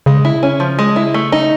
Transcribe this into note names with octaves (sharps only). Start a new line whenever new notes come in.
C#3 G#3
E4
C#4
F3
G#3
E4
A3
D#4